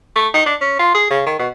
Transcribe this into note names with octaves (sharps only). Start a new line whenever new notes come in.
A3
D#4
D4
C#4
F4
G#4
C#3
D#3
B2